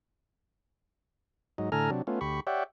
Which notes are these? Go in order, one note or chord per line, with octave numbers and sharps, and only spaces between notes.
G#2 F#3 D#4
A2 D3 A4 G#5 A#5 F6
C3 F#3 D4
A3 B3 C#4 F4
D2 G4 B5 C#6
G4 C#5 D5 E5 F#5 G5